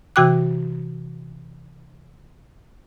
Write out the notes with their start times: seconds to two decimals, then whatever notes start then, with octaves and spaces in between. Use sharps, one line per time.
0.16 C3 E3 F#4 G5 D6 F#6